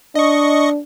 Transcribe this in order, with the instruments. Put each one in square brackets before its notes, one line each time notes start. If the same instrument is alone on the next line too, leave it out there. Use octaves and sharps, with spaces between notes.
[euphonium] D4 [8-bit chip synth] D#5 C#6